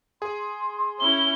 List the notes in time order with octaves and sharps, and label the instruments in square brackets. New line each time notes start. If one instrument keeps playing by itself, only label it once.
[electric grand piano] G#4 [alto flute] C6
[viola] C#4 E4 [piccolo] G7